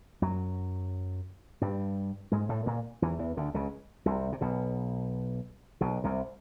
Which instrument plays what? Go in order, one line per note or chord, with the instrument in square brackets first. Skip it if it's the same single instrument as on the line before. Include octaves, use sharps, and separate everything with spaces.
[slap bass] F#2 F#3
G2 G3
G#2 G#3
A2 A3
A#2 A#3
E2 E3
E2 E3
D2 D3
C#2 C#3
C2 C3
C3
B1 B2
B1 B2
C2 C3